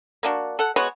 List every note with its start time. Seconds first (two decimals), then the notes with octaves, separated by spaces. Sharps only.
0.23 A#3 D4 F#4
0.59 A4 F#5
0.76 G#3 B3 F#4 C#5